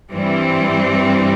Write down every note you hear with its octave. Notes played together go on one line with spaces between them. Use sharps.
G2 E3 G3 C4